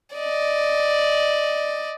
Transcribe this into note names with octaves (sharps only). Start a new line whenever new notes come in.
D5 D#5